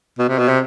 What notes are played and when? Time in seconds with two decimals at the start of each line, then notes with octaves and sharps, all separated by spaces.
0.19 B2
0.28 C3
0.38 B2
0.48 C3